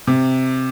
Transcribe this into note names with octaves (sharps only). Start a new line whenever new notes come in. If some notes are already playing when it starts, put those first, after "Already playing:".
C3